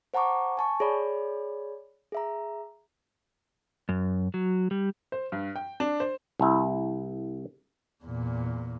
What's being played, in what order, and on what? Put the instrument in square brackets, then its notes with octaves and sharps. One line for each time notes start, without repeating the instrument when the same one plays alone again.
[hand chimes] C5 F#5 A5 A#5 C#6 D6
G#5 A5 C#6
G#4 C#5 D5 B5
G#4 E5 A#5
[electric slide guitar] F#2
F#3
G3
[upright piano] C5
G2
G5
D4
C5
[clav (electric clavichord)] C2 E4
[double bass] E2 A#2